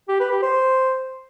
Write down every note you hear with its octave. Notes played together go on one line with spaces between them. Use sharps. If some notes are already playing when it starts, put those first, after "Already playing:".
G4
B4
G4
C5